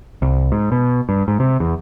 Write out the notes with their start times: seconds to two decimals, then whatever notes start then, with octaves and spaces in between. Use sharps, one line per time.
0.22 C2
0.52 G#2
0.72 B2
1.09 G2
1.28 G#2
1.40 C3
1.60 E2